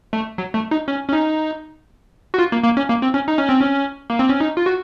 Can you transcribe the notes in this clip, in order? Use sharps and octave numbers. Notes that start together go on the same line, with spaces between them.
A3
F#3
A3
D#4
C#4
C#4
D#4
F#4
F4
A#3
A#3
C#4
A#3
C4
C#4
D#4
C#4
C4
C#4
A#3
C4
C#4
D#4
F4
F#4